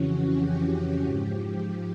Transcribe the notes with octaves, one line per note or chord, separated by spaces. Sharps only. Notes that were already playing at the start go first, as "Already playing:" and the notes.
Already playing: F2 C#3 E3 C#4 F#4
G4
G#2 F3